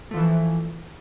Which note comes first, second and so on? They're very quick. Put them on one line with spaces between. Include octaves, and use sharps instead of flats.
A3 F3 E3